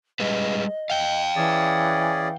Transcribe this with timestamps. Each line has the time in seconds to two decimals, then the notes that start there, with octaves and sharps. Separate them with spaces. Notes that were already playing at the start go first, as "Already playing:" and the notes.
0.20 G3 G#3 B4 D#5
0.90 F5 G5
1.36 E3 C#4 G#4 D5